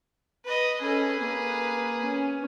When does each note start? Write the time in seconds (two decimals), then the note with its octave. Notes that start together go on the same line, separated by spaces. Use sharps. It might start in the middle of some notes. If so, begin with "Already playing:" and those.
0.45 B4 D#5
0.81 C#4 G#4 A4 B4
1.21 A#3
2.04 C#4